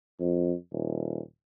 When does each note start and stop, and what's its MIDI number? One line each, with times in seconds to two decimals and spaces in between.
0.20 0.54 41
0.72 1.20 27